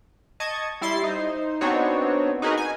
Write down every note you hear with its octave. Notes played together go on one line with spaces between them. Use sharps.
D#5 A5 C#6 G#6
G3 E4 C6 A6 C7
D#4 C5
B3 C4 D4 D#4 F#4 C#5
D#4 F#4 G#4 A#4 B4 D#5
G#5